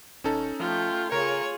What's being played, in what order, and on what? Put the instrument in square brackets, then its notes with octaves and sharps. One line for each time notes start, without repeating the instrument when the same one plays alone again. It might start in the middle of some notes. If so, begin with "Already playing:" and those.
[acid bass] D#1 [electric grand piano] C#4 D#4 A4
[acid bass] F3 [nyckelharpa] A3 G5 [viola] F4
[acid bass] C#3 [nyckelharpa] F4 G#4 [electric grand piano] A#4 [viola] C#5